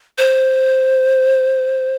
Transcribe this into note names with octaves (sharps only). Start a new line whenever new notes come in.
C5